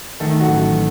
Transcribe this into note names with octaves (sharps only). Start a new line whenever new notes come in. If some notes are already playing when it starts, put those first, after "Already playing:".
D#3 A3 A4
F#3 F#4
A1